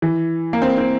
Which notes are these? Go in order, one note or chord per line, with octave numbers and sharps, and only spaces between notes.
E3
A#3
C4
C4